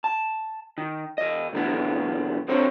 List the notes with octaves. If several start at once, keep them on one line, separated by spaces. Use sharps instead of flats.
A5
D#3
E2 D#5
B1 F2 D3 E3 B3
F#2 D3 C4 C5 C#5